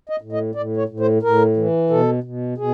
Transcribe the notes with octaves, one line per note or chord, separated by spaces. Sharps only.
D#5
A2
D#5
A2 D5
C#5
A2
C5
A2 A#4
E3
B2 A4
B2
B2 G#4